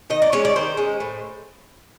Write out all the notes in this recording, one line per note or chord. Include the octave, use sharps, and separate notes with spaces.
D#3 D#5
D5
G#3 C#4 C#5
D5
D#3 C5
G#3 C#4
A2